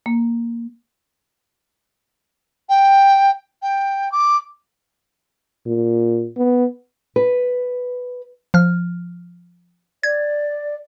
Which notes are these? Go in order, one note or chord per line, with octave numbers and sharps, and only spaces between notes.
A#3
G5
G5
D6
A#2
B3
B4
F3 F6
D5 G#6